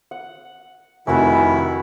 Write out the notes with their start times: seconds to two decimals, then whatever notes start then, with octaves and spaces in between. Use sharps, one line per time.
0.11 F#5
1.07 F1 D#3 E4 F#4 G#5 A#5 B5 E6